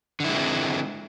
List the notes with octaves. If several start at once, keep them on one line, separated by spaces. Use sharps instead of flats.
D3 G#3 C4 E4